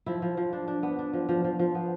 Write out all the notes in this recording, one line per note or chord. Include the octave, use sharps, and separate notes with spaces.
F3 E4
F3
F3
D4
D4
B3
D4
F3
F3
F3
F3
B3